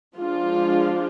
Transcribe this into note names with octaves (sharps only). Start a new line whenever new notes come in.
F3 G#3 D4 F4